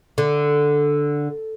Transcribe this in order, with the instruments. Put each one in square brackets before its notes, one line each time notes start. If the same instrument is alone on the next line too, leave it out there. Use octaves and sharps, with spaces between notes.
[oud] D3